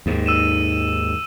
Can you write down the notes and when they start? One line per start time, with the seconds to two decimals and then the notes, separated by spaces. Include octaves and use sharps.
0.06 D#2 G#2
0.26 E6 D#7 E7